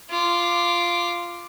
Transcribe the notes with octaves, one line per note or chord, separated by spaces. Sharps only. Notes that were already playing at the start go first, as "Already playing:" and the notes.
F4 D6